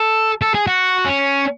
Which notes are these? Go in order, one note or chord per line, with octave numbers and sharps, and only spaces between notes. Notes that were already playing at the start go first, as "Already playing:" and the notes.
Already playing: A4
A4
G#4
F#4
C#4